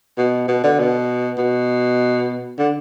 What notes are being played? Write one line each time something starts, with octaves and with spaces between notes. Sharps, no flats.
B2
B2
D3
B2
B2
D3